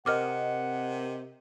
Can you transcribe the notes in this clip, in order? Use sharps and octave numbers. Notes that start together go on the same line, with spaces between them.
C3 C4 A#4 D#5 F#5 D6 F6